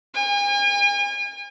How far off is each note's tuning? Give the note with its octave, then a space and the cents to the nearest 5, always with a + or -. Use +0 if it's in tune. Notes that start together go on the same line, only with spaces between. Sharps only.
G#5 -40